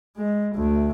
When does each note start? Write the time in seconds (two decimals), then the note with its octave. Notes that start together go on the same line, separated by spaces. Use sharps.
0.17 G#3
0.55 D2